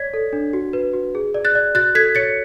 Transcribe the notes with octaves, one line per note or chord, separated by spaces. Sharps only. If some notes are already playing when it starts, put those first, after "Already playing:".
Already playing: C#5 D5 G#6 B6
A4
D4
F#4
B4
F#4
G#4
D5
F#6 A6
D5
F#4 F#6 A6
A4 G#6 B6
C#5 A6 C#7